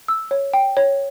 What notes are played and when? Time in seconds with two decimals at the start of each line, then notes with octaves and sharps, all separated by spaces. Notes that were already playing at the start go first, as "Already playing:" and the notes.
0.08 E6
0.31 C#5
0.54 G5
0.77 C#5